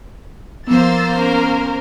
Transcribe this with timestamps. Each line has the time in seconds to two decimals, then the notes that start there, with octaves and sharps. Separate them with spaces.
0.67 F3 A#3 B3 C5 E6 A6
1.16 C#4 A#4